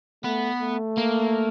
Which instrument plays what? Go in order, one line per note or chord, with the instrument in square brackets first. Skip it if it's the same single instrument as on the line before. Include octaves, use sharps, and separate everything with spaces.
[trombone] A3 [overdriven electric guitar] B3
[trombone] A3
[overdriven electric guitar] A#3